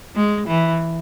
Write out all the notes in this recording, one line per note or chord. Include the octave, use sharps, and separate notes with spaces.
G#3
E3